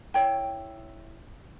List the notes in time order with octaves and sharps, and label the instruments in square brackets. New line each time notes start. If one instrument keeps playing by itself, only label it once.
[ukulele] E4 C#5 G5